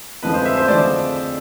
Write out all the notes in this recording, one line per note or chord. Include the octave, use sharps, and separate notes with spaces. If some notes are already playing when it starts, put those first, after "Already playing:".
F2 D3 F3 G#3 B4
C5
E5
C5
F2 D3 F3 G#3 D5